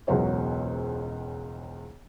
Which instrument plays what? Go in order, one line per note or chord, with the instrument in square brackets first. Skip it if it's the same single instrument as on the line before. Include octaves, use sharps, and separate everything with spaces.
[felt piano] E1 C#2 B2 F#3 C5 C#5